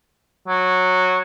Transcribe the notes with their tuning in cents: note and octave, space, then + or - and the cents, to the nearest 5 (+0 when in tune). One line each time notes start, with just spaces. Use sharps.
F#3 -10